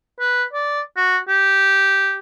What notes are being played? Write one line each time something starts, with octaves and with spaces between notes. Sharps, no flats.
B4
D5
F#4
G4